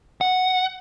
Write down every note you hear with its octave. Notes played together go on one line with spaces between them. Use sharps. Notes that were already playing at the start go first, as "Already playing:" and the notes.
F#5